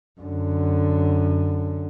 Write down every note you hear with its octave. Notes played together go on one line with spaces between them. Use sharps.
F#2 D3